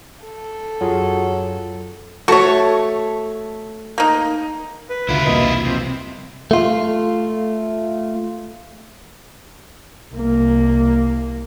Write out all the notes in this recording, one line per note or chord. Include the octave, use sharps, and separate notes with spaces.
A4
F#2 F#3 F4 G#4
A3 F#4 A4 C#5
A#3 D#4
B4
C#2 D3 E4 F4
E1 C2 A#3 D#5
C3 F3
A3 F4
C2 A#3